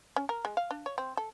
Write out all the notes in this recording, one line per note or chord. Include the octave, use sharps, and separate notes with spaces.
C#4
A#4
G#3
F5
D4
C#5
C4
A4